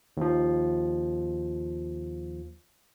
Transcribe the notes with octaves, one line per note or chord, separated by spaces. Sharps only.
D#2 F3